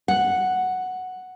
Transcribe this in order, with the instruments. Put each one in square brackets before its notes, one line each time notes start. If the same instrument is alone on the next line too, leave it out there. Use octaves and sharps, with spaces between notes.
[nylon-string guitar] F#5